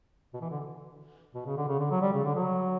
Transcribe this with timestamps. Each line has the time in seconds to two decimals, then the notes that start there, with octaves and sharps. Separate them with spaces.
0.33 B2
0.41 E3
0.51 D3
1.34 B2
1.46 C#3
1.57 D3
1.68 C#3
1.79 D3
1.91 F#3
2.02 G3
2.13 C#3
2.24 D3
2.35 F#3